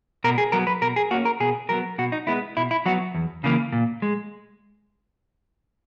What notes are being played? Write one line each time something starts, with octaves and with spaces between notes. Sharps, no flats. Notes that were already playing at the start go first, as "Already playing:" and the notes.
B2 A#4
G#4
F#3 B3 A#4
B4
B2 A#4
G#4
A#3 C#4 F#4
A#4
B2 G#4
F#3 B3 A#4
B2 F#4
D#4
G#3 B3 E4
B2 E4
E4
F#3 B3 F#4
E2
C#3 E3 A#3
A#2
G#3